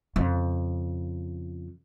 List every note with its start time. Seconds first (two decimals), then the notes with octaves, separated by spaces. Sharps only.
0.16 F2 C#3